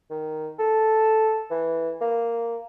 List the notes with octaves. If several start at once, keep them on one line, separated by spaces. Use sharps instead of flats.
D#3
A4
E3
A#3